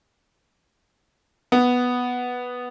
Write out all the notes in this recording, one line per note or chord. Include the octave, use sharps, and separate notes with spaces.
B3